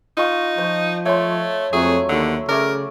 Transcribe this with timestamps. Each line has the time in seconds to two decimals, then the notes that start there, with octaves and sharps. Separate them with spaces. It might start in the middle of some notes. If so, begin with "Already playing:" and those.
0.17 D#4 F4 D#5 C#6
0.58 F3 C5
1.06 A3 C#5 C6
1.73 F2 F#3 A3 G#4
2.09 D#2 D3 E6
2.49 C#3 A3 A#4 D5